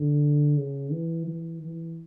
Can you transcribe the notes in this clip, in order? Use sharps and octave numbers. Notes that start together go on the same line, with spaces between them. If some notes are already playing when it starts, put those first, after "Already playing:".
Already playing: D3
C#3
E3
E3
E3